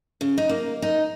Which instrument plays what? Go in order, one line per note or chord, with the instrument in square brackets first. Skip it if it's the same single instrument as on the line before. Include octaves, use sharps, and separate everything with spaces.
[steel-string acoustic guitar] C#3
D#4
A#3
D#4